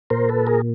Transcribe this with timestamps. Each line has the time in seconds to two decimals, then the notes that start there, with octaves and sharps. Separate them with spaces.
0.10 A#2 A#4 C5
0.29 A4 B4
0.47 G#4 A#4